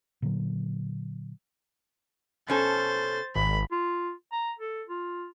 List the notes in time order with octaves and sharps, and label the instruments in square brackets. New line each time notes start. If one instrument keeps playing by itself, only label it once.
[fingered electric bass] A#2 D3 F#3
[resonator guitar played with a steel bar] B2 C#4 A4 [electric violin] C5 A6
[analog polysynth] G#1 [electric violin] B5
[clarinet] F4
A#5
A4
F4